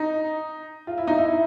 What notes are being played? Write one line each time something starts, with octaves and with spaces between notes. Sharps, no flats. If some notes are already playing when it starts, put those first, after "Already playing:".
Already playing: D#4
F4
E4
D#4
E4